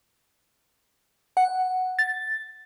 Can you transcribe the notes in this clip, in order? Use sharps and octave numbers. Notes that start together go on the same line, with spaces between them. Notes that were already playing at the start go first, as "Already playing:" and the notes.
F#5
A6